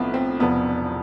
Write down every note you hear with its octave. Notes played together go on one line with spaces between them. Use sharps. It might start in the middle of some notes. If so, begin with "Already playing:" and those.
Already playing: B1 A2 F3 B3 C4 E4
C4
E1 E2 C3 F3 B3